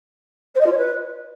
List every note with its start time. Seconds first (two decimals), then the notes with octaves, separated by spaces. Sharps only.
0.55 C5
0.60 D#5
0.66 F4
0.72 C#5
0.77 B4